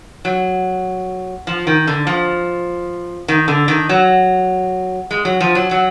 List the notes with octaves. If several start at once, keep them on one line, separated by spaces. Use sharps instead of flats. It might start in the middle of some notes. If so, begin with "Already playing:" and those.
F#3
F3
D#3
D3
F3
D#3
D3
D#3
F#3
G#3
F#3
F3
F#3
F#3